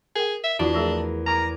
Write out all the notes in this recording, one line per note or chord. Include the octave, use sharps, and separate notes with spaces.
G#4 A#4 G5
E5
E2 D4 F4 F#4
F3 A3 G#4 A#4
A#4 G#5 A#5 D6